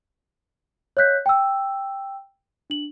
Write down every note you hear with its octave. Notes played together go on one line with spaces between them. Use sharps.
C#5 D#5 F5 F#6 G6 B6
G5 E6
D4 F#7